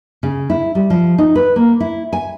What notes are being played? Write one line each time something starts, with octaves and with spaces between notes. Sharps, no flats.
C#3
E4
G3
F3
D#4
B4
A#3
E4
G#5